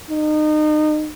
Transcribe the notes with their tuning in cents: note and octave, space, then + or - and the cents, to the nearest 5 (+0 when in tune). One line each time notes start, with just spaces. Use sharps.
D#4 -30